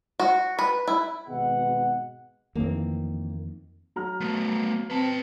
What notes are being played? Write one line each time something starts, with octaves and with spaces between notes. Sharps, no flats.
F#4
B4
E4
G#1 B2 G#3 B3 F#5
F2 D#3 E3 A#3 C4
F#3 A#5 F6
A3 B3
C4 B4 A5